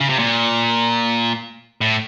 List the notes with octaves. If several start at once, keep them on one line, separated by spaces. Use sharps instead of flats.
C#3
C3
A#2
A2